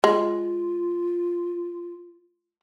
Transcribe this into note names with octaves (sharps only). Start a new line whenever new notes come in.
G#3 F4